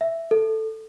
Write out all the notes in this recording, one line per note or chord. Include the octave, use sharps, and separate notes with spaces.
E5
A4